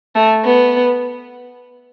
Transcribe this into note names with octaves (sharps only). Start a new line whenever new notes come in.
A3
B3